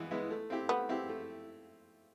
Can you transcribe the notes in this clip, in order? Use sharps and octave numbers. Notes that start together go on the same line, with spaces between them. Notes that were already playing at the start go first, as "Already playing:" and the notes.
Already playing: E3 G#3 B3 E4
G#3 B3 E4
A3
C4 E4 G4
A3 B3
C4 E4 G4
A3